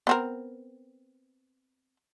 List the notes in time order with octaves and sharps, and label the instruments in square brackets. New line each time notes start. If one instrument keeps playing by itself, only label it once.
[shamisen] B3 C4 A#4